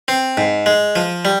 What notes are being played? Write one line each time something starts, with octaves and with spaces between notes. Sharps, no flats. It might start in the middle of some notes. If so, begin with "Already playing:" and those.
C4
G#2
G#3
F3
G3